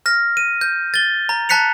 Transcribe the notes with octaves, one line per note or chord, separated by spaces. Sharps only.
F6 A#6
D#7
G6
A6 G7
A#5
A5 A#5 F#6 B6 C#7 F7